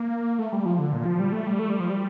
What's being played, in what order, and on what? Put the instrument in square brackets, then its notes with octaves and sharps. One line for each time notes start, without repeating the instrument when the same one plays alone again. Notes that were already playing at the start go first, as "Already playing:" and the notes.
Already playing: [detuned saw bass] A#3
A3
G3
F3
D3
A#2
F3
G3
A3
G3
A3
G3
F3
G3